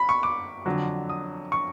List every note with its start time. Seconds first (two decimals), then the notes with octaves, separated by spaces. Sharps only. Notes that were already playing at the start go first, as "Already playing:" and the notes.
Already playing: B5
0.09 C#6
0.23 D6
0.66 F2 D3 F#3
1.10 D#6
1.52 C#6